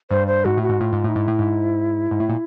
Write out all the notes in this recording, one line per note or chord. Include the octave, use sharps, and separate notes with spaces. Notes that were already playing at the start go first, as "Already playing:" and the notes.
G2 C5
C5
G#2 F#4
A2
F#4
G#2
A2 F4
G#2
A2 D#4
G#2 E4
A2
G#2
G#2
A2
A#2